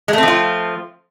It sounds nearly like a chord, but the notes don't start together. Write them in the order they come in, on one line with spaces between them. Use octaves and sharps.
G#3 A3 C4 F3 F4